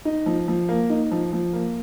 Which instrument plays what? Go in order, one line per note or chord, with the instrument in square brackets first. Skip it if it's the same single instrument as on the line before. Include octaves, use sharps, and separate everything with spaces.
[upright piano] D#4
F3
F3
A#3
D#4
F3
F3
A#3